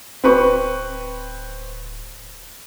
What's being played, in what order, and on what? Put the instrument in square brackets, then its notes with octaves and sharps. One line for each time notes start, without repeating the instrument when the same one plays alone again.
[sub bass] D1 [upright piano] C4 B4 C#6